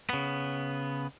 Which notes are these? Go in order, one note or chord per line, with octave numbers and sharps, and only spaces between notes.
C#3 B3